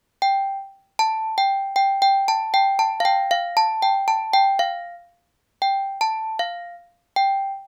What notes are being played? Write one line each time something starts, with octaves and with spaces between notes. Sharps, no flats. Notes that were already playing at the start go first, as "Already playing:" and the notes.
G5
A5
G5
G5
G5
A5
G5
A5
F5
G5
F5
A5
G5
A5
G5
F5
G5
A5
F5
G5